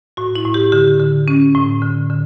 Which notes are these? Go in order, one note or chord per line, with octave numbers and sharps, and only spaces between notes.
A2 F#4
E4
A2
G4
D3 G4
D3
C#4
A2
D3
D3